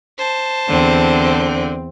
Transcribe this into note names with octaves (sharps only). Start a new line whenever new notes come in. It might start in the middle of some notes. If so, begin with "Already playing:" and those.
C5 A5
E2 D3 C4